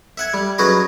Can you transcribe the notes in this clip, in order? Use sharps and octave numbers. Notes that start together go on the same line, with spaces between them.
E5 F#5 G#5
G3
F#3 C#4 F#4 G#4 B4 D#5